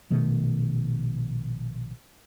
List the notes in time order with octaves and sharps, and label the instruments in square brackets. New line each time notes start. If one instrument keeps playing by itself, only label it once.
[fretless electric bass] A#1 B2 D#3 A3